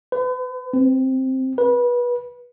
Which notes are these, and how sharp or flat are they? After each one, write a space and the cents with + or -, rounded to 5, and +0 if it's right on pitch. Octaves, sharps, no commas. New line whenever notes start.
B4 +40
C4 +5
B4 -25